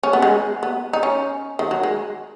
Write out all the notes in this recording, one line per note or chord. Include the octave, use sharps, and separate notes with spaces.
C#4
B3
G#3
B3
D#4
C#4
D#3
F#3
G#3